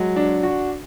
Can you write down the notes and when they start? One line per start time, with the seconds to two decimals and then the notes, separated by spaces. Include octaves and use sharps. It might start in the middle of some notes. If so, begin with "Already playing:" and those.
Already playing: F#3 G#3
0.16 D4
0.43 F#4